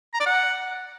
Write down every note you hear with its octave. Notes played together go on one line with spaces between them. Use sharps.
A#5
D5
F#5